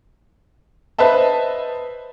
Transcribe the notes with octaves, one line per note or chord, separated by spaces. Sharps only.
B4 C5 D#5 E5 A5